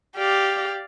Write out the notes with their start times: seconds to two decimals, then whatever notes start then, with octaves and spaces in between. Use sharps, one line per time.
0.18 G4 D5 F5